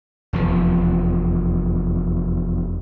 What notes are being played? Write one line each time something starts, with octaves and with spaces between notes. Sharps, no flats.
F1 E2 F3